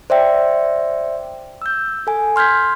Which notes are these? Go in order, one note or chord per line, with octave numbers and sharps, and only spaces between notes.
C5 D5 E5 G5
E6 G6
A4 G#5
C6 F6 G6 G#6 B6